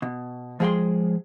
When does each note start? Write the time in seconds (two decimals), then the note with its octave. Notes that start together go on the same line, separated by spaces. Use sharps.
0.02 B2
0.60 F3 G#3 G#4 F#5 G5 C6